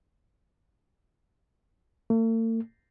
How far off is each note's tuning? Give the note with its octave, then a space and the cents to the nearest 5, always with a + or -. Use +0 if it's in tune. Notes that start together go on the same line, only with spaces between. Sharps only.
A3 +45